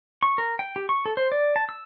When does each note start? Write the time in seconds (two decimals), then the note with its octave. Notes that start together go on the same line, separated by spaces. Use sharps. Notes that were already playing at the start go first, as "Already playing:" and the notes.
0.23 C#6
0.38 A#4
0.59 G5
0.76 G4
0.89 C#6
1.06 A4
1.17 C5
1.32 D5
1.56 A5
1.69 E6